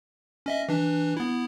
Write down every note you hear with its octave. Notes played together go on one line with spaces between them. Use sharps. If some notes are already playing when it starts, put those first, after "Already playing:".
C#4 D#5 E5
E3 D4
B3 E4